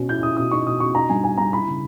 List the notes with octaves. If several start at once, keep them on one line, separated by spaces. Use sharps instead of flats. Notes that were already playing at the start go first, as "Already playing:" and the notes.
Already playing: B2 C#4
E4 G6
E4 D#6
B2 D#6
D#4 C#6
B2 D#6
B2 C#6
D#4 A#5
G2 G#5
D#4 G#5
G2 A#5
E4 B5
C#3